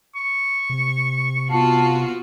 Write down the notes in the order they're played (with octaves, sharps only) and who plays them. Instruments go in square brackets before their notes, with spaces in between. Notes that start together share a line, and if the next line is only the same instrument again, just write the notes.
[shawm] C#6
[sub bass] C3
[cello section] B3 F4 F#4 [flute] A5